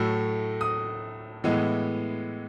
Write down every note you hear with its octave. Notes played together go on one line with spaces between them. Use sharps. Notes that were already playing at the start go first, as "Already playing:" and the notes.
Already playing: A2 F#3 A3 E6
D#6
A2 E3 G#3 B3